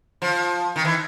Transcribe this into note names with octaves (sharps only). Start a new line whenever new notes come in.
F3
D#3
E3